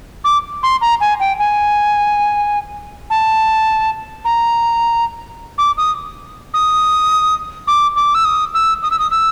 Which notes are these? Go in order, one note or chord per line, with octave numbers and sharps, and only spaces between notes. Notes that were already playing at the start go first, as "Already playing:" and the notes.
D6
C6
A#5
G#5
G5
G#5
A5
A#5
D6
D#6
D#6
D6
D6
E6
D#6
E6
D#6
E6
D#6
E6